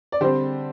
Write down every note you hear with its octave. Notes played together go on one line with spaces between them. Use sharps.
D5
D3 G3 C4 G4 C5